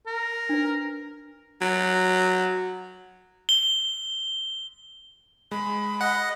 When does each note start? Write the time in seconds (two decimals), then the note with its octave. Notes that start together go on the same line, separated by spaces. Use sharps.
0.06 A#4
0.49 D4 B4
1.61 F#3
3.49 G7
5.51 G#3 B5
6.01 D#5 F#5